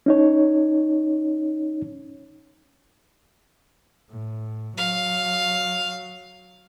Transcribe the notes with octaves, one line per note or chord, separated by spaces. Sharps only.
C#4 D#4 C#5
A2
F#3 F5